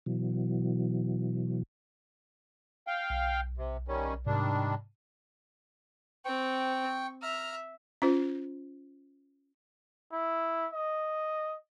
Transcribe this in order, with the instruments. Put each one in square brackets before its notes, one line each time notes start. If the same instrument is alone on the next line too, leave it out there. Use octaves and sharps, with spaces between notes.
[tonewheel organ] B2 E3 F#3
[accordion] F5 G5
[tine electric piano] B1
[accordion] C3
D#3 G3 C#4
[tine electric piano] G#2 C3 [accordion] D#3 G3 D4
[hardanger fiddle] C4 [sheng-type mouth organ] G5 C#6
[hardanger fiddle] E5 [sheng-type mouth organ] A#5 F6
[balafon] C#4 F4 C5
[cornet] E4
D#5